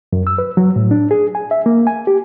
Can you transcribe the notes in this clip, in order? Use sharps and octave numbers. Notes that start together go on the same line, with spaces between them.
F#2
E6
B4
F#3
A2
D4
G#4
G#5
E5
A#3
G#5
G4